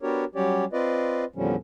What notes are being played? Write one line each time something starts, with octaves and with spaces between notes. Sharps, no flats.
B3 D4 F#4 G4 A#4 C#5
F#3 G3 C#4 G4 C#5 D5
C4 F4 B4 D5 D#5
E2 A#2 D3 F3 G3 C#4